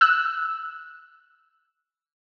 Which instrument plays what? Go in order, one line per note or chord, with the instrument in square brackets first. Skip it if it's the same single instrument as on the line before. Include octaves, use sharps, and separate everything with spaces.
[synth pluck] E6 F#6